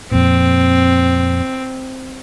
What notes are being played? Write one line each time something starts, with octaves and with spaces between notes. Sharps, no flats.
F2 A#2 C4